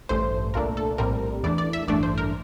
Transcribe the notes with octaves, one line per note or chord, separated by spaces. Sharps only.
A1 G2 E3 A3 C5
C2 A#2 A3 D4 A#4
A4
A#1 A2 G3 C4 A#4
E2 E3 A3 D4 D5
D5
E5
A1 G2 E3 A3 D4 D5
C5
A#4